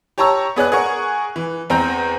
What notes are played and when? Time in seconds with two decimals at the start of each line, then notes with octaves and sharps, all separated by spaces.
0.18 G4 C#5 A5 A#5 C#6 E6
0.56 B3 G#4 D5 F#6
0.72 G#4 A#4 F#5 C#6
1.36 E3
1.70 E2 C4 A#5 G6